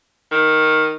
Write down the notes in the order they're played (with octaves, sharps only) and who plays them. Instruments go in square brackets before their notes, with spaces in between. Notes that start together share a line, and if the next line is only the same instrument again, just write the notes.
[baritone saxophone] D#3